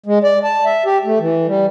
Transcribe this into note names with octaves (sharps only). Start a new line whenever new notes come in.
G#3
D5
A5
E5
G4
A3
E3
G3